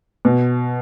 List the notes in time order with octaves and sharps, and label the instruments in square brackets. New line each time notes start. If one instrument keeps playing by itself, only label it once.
[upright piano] B2